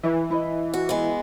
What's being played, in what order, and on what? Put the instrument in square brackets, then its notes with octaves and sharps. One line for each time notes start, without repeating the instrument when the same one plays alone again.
[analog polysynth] E3 [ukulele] E4 E5
[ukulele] E4 B4 D#5
[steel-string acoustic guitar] F#4
G#3 B3